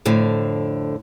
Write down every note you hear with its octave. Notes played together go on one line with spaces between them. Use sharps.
F2 A2 D3